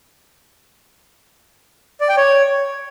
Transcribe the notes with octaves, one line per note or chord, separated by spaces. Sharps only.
D5
G5
C#5